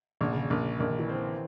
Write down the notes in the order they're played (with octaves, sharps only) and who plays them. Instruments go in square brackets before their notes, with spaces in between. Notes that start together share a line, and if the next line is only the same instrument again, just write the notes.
[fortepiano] A#1 [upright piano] D3
[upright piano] C#3
D3
[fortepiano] A#1
[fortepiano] A#1 [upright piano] D#3
[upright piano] E3
[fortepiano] C4
[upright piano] D#3